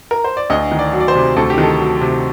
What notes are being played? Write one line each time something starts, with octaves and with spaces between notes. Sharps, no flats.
A#4
C5
D5
D2 D#5
D#3
D5
F#3
D5
C5
C3
D2 A4
G4
D#3
A4
F#3
C3